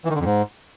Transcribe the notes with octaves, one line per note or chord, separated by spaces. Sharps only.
E3
D#3
D3
F2
G#2